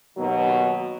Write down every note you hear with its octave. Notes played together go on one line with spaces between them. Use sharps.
D#2 B2 F#3